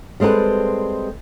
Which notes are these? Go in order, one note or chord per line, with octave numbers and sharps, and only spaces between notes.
G3 G#3 C4 A4 B4